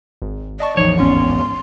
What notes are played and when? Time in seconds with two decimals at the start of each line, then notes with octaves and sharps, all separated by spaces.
0.22 G#1
0.60 D5 D#5 A5 C#6
0.77 A1 E2 F3 D#4 C#5
0.98 D1 G#1 G#2 B3 C#4 C6